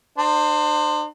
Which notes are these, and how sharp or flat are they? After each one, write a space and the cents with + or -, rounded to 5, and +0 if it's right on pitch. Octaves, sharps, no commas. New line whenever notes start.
D4 +45 C5 +0